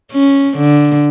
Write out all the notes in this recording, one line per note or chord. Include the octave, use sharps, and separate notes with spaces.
C#4
D3